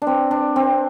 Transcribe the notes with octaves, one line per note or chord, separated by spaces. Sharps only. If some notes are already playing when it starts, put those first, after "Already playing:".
D4
C4
D4
C4